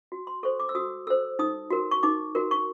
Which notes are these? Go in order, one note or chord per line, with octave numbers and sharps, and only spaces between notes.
F#4
C6
A4 C5 C#6
D6
E6
F#4 D#6
A4 C5 E6
D#4 D#6
F#4 A#4
C#6
D#4 D6
F#4 A#4
C#6